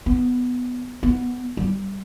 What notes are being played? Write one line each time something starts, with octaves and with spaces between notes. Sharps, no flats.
B3
B3
G3